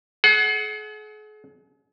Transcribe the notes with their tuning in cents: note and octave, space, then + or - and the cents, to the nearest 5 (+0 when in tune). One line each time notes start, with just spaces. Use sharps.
G#4 +45 F#5 +10